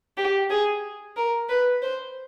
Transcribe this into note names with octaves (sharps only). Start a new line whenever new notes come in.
G4
G#4
A#4
B4
C5